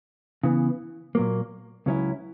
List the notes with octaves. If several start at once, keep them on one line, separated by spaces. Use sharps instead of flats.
C#3 E3 B3
A#2 F#3 A#3
C#2 C#3 F#3 C#4 E4